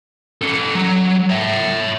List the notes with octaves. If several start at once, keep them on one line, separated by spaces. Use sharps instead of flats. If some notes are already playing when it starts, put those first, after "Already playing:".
C#4 A4
F#3
C#5 E5